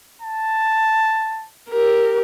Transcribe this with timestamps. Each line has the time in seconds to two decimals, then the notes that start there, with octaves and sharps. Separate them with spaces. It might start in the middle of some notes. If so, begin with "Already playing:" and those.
0.22 A5
1.70 G4 A#4